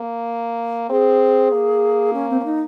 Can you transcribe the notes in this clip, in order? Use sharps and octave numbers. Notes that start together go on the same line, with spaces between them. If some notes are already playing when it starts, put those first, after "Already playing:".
Already playing: A#3
C4 G#4
A#3
C#4
C4
C#4
D#4